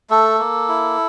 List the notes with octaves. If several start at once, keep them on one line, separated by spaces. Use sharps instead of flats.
A3 A4
A#3
E4